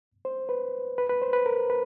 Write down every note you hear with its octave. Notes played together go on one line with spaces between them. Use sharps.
C5
B4
B4
B4
C5
B4
A#4
B4